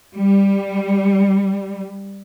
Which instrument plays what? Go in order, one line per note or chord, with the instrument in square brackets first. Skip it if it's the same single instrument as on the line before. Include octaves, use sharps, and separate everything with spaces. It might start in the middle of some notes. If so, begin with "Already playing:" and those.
[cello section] G3